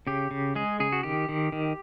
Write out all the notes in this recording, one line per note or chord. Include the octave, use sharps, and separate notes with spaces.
C#3 G4
C#3
G#3 G#4
C#3 G#4
F#4
D#3 G4
D#3
D#3